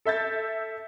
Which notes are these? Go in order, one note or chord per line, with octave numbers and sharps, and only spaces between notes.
A4 E5 G6 A6